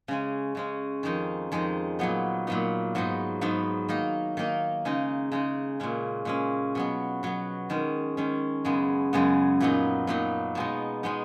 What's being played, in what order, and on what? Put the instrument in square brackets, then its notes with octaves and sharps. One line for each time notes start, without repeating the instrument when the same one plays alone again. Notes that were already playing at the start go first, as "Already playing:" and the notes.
[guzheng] C#3 G#3 C#4
C#3 G#3 C#4
F2 D#3 G#3 D#4
F2 D#3 G#3 D#4
A#2 F#3 B3 D#4
A#2 F#3 B3 D#4
G#2 F#3 B3 D#4
G#2 F#3 B3 D#4
D#3 A#3 D#4
D#3 A#3 D#4
C#3 G#3 D#4
C#3 G#3 D#4
A#2 G#3 C#4
A#2 G#3 C#4
B2 F#3 B3
B2 F#3 B3
D#3 G#3 C#4
D#3 G#3 C#4
F#2 C#3 G#3 B3
F#2 C#3 G#3 B3
A#2 F#3 B3 D#4
A#2 F#3 B3 D#4
B2 G#3 B3 D#4
B2 G#3 B3 D#4